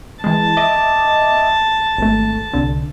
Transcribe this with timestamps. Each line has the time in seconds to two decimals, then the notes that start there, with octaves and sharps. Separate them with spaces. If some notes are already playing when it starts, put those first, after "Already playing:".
0.24 E3 G#3 A5
0.57 D#5 E5 D6
1.98 G#1 A3
2.53 C2 D3